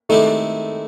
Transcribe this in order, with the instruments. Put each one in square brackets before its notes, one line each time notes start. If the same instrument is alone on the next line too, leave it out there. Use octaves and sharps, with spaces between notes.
[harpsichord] D#3 G#3 C4 E4 G4 [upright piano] A3